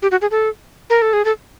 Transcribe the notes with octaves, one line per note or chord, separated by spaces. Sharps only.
G4
F#4
G#4
A4
A#4
A4
G#4
A4